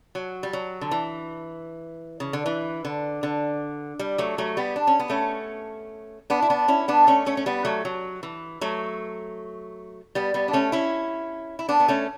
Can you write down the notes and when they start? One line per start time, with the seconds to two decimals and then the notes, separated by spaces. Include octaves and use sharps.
0.15 F#3
0.43 G3
0.53 F#3
0.81 D3
0.91 E3
2.20 C#3
2.33 D3
2.46 E3
2.85 D3
3.23 D3
3.99 G3
4.18 F#3 A3
4.38 F#3 A3
4.57 G3 B3
4.76 D4
4.87 C#4
4.99 B3
5.10 A3 C#4
6.30 B3 D4
6.42 E4
6.50 B3 D4
6.68 C#4 E4
6.88 B3 D4
7.07 A3 C#4
7.26 A3 C#4
7.37 C#4
7.46 G3 B3
7.65 F#3 A3
7.85 F#3
8.23 E3
8.61 F#3 A3
10.15 G3 B3
10.34 G3 B3
10.48 D4
10.53 A3 C#4
10.72 C#4 E4
11.59 E4
11.69 B3 D4
11.80 B3
11.88 A3 C#4